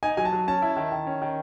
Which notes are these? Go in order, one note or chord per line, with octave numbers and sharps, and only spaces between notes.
D#4 G#5
F#3 G#5
A5
F#3
C#4 A5
E4
D#3
D#3
C#4
D#3